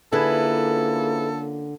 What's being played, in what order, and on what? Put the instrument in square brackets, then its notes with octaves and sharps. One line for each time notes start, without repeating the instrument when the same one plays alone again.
[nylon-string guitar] D3 [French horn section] A#3 C#4 F4 [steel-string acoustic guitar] E4 G#4 B4 [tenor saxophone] A4